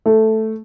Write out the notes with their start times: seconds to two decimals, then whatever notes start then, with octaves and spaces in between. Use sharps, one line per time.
0.06 A3